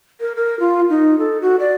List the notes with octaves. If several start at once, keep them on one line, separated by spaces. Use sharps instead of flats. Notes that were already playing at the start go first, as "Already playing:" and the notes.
A#4
A#4
F4
D#4
A4
F#4
D5